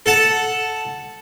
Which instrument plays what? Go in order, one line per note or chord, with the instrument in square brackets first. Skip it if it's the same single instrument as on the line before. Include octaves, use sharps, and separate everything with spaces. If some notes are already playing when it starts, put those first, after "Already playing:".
[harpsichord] A4 F#5 A5